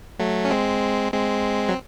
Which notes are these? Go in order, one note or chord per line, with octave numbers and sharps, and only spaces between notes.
F#3 A3
C#4
G#3 C4
G#3 C4
F#3